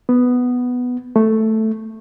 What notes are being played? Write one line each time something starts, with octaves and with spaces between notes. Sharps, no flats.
B3
A3